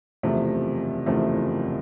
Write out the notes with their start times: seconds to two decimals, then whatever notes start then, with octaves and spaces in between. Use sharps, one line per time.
0.23 F#1 E2 C3 F3 A3
1.06 F#1 E2 C3 F3 A3